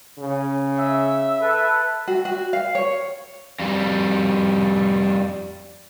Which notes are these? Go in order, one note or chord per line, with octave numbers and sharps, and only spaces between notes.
C#3
E5 E6
A4 B4
F#4
F#4
F5
C#5
F2 G3